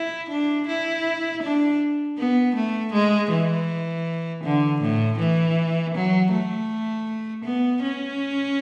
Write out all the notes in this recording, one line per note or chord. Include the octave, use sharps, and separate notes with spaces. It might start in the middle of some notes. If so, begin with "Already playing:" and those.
Already playing: E4
D4
E4
D4
B3
A3
G#3
E3
D3
A2
E3
F#3
A3
B3
C#4